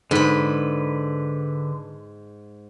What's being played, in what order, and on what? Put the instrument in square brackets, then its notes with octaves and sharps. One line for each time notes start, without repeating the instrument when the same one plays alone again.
[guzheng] G#2 B5 [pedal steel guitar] D3 B4